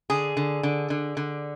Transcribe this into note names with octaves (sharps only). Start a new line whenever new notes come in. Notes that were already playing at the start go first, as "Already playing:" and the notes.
D3 G#4
D3
D3
D3
D3